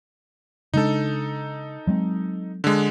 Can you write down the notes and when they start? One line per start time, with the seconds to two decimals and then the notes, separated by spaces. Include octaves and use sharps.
0.74 C#3 G#3 D4 D#4 A4
1.87 F#3 G#3 C4
2.64 D3 G#3